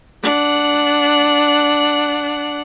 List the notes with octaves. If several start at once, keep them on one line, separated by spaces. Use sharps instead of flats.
D4 F#5